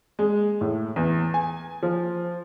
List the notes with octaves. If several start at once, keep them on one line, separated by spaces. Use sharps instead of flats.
G#3
A2
E2
G#5
F3